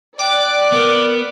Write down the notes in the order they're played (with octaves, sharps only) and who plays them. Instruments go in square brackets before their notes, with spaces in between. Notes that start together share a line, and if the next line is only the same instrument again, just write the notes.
[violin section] D5 F#6 [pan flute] G5 [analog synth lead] D6
[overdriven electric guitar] B3 [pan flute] A#4